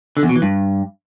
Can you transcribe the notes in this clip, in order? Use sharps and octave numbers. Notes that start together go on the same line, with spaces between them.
D3
E2
B2
E3
G2